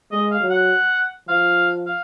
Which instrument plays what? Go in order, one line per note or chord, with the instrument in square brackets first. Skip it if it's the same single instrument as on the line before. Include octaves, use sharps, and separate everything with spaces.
[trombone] G#3 [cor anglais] D#5
[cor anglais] F5
[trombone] F#3
[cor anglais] F#5
[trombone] F3 [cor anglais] F5
[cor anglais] F5